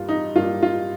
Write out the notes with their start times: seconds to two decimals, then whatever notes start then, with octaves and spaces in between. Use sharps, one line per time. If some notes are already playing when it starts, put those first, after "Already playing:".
Already playing: G2 G3 A#3 F4
0.09 D#4
0.36 G2 G3 A#3 F4
0.63 F4